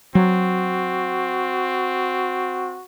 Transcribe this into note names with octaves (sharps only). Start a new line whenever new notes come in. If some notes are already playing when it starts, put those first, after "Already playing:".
F#3 C4 F#4